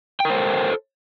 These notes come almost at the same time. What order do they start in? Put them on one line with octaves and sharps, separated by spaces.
G5 A#4 C5 A4